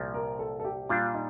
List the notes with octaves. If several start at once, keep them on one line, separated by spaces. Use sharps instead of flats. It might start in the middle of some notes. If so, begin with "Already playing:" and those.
Already playing: C2 A#2 F3
A#4
A4
A4
G4
A#2 G3 D4 F4
D#4